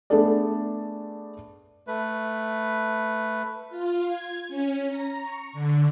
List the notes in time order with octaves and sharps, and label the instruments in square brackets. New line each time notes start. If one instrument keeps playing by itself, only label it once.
[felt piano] A3 B3 D4 G#4 A4 D5
[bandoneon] A3 B4
[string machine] F4
G#6
C#4
A#5
C#6
D3